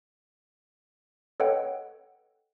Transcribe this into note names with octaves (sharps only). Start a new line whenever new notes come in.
A4 B4 C#5 D#5 F#5 G5